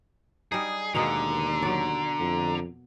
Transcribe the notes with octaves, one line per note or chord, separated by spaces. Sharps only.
G3 D#4 G#4
D#2 B2 D3 G#3 A#3 A#5
F#3 D5
F2